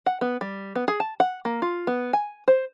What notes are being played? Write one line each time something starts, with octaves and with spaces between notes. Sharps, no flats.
F#5
B3
G3
B3
G#4
A5
F#5
A#3
F4
B3
G#5
C5